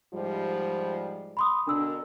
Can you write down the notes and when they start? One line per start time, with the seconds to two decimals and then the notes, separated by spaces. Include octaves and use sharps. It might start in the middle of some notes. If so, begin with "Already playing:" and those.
0.14 G#2 F3 G3
1.37 B5 C6 D#6
1.67 B2 D3 D4 A#4 E6